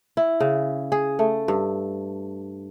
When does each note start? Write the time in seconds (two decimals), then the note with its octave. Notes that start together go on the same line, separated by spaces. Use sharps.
0.17 E4
0.40 C#3
0.92 G#4
1.19 A3
1.48 G2